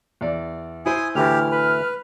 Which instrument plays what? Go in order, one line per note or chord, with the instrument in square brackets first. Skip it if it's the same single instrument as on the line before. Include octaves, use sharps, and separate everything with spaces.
[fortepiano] E2 D5
[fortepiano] E4 C5 [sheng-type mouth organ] G#5 D#6
[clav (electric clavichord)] D2 A2 E3 [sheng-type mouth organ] G4 [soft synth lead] F6
[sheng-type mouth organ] B4